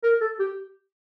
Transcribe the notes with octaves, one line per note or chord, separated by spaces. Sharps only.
A#4
A4
G4